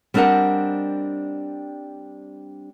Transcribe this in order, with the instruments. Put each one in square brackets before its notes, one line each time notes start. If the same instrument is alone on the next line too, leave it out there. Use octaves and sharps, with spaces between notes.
[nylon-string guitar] G3 C4 D4 A#4 D#5 F#5